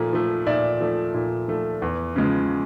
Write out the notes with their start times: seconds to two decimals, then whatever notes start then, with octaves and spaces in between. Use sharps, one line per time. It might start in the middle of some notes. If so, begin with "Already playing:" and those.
Already playing: A#2 F3 A3
0.13 F3 A3
0.47 A#2 D5 E5
0.81 F3 A3
1.14 A#2
1.48 F3 A3
1.82 E2
2.16 C#3 F3 G#3